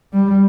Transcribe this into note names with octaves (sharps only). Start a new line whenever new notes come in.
G3